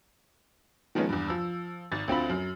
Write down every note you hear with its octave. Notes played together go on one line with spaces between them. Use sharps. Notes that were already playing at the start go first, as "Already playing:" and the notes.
D#3 F3 G#3 B3 C#4
E2 G2
F3 E6
G#1 A6
D2 C4 F4 B5
F#2